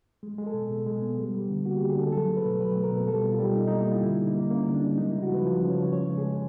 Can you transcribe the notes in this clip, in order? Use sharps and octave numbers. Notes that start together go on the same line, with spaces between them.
G#3
G#3
A4
B2
B2
G#3
B3
G3
G3
D3
A#3 F#4
D3 G4
G#4
D3 A4
F#3 A4
A3
B4
B2
F#3 B4
A3
A#4
B2
G3 A4
B2
F4
G3
B2 D#4
A#3 D#4
E4
G3 F4
D3 E4
A#3
D#4
A#3
A#3 C#4
D3
D4
G3
G#3 D#4
C#3 E4
F#4
F3 B4
F3
C#3
C#5
F3
C#3 C#5
G#3
G#4
G#3